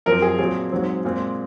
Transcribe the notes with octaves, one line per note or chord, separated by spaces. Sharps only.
F#2 F3 C4 A#4
G#4
A#2 F#3 C4 G#4
G#2 F#3 C4
A#2 G#3 C4